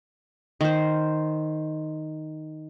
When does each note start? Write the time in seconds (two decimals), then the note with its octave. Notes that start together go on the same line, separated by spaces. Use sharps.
0.61 D#3 C5